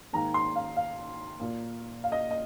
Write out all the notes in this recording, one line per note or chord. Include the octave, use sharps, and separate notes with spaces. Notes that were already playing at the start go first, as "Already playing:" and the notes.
G#2 D#3 A#3 A#5
C6
F5
F5
A#2 A#3
F5
D#5
D#5